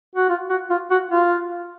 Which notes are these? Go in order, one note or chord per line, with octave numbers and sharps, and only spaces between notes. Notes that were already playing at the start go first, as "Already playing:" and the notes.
F#4
F4
F#4
F4
F#4
F4